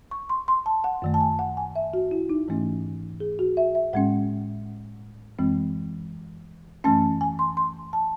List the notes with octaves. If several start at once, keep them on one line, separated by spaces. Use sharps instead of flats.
C#6
C6
C6
A5
F#5
F#2 D#3 A3
A5
G#5
F#5
G#5
E5
F#4
E4
D#4
G#2 E3 A3 C#4
G#4
F#4
E5
E5
A2 G#3 C#4 F#5
F#2 E3 G#3 C4
F#2 E3 A3 C#4 A5
G#5
C6
C6
A5